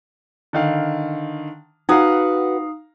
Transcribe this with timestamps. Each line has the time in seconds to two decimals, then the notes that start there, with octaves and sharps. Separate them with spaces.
0.53 D3 D#3 F5
1.89 D#4 F#4 B4 F5 F#5 A#5 D#6